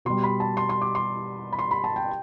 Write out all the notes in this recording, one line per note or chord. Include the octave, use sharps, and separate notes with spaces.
B2 G3 C6
B5
A5
C6
C6
D6
C6
B5
C6
B5
A5
G5